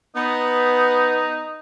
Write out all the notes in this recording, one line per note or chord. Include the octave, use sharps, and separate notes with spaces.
B3 D#4